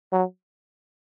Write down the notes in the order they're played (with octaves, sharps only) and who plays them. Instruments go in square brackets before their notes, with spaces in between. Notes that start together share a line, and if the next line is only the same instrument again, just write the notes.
[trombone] F#3